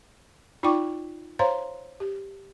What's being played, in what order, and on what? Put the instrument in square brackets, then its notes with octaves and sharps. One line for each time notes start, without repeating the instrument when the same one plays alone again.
[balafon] D#4 F4 D5 G5 C#6 D6
C5 C#5 F5 A#5 C6
G4